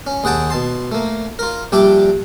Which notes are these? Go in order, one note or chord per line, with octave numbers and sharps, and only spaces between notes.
C#4
D#2 G#4 F#5 G5 A5
B2 A5 C6
A3 A#3
F4 A#4
A#1 G3 D4 G4 E5 D6